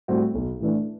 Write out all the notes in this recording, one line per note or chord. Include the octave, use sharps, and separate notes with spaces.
A2 G3 C4 F#4
B1
A2 E3 A3 D4